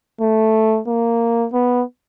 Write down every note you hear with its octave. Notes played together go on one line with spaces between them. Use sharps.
A3
A#3
B3